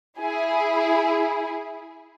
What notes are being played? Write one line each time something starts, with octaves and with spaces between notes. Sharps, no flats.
E4 G#4